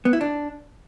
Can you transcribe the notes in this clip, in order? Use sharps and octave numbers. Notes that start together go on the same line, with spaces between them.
B3
E4
D4